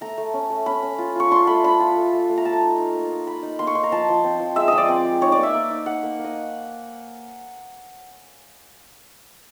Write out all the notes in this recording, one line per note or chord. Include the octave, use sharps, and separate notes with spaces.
A3 A#5
A3
C#4
A3
C#4 B5
C#4
F4
F4 C#6
D4 C6
A3 B5
D4 B5
F4
A3
A3
A3
A#5
A3 A5
A#5
D#4
D#4
A#3
D#4
A#3 B5
D#4
A#3 C6
C#6
D#4 C6
A#5
F3 A5
F3
C4
F3
G#3 E5
F3 D#5
D5
C4
G#3
D#4 C#5
D5
A#3
E5
A#3
D#4
D#4 F#5
A#3
A#3
D#5